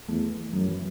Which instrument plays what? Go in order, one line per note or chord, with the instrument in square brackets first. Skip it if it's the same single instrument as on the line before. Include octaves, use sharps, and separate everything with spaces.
[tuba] E2 [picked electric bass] A3
[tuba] F#2 [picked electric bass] F#3
[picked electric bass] E3